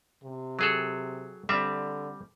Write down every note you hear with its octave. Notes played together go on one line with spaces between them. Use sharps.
C3
F#3 G#4 A4
D3 G3 C4 E5